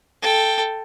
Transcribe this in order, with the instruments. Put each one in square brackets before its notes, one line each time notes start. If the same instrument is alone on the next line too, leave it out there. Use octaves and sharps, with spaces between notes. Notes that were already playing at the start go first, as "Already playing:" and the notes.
[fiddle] A4 G5